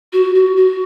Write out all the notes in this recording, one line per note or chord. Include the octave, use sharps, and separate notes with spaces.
F#4
F#4
F#4